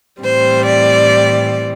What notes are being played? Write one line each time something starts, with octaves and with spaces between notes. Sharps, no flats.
A2 E3 G3 C4 C5
D5